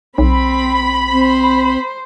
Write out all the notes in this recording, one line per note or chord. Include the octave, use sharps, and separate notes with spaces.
B1 C4 B5
C4 C5